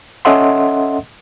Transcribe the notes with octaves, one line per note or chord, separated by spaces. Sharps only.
C#4 A4 D#5 E5 F#5 C6